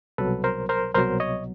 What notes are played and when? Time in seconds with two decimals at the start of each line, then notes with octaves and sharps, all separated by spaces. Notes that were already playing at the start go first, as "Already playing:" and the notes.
0.18 C2 B2 F#3 A4 B4
0.44 A#4 C5
0.69 A#4 C5
0.95 C2 B2 F#3 A#4 C5
1.20 C#5 D#5